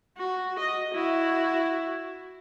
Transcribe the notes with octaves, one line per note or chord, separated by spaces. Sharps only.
F#4
D#5
E4 F#4